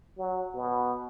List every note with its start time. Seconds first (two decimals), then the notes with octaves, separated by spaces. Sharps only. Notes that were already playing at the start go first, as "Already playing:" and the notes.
0.18 F#3
0.55 B2